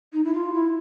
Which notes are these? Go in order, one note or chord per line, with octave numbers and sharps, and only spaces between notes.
D#4
E4
F4
E4